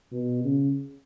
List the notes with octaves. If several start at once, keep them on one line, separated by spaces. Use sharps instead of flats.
B2
C#3